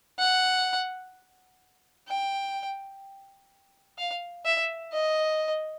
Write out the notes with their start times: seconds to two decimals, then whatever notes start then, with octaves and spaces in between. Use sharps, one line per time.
0.19 F#5
2.08 G5
3.98 F5
4.45 E5
4.93 D#5